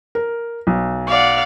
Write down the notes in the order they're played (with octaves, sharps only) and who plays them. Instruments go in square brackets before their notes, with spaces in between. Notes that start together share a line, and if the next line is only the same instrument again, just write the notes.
[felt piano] A#4
B1
[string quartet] D5 F5 F#5